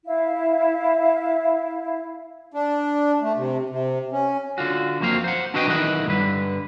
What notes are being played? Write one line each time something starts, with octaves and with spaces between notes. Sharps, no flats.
E4 F5
D4
A3
C3
C3
C#4
D3 F4 F#4
F2 F#3 A#3 C4 F5
C5 F#5
D4 E4 F#4 B4 D#5 G5
B1 D#3 E3 D#5 F#5
G2 D3 B4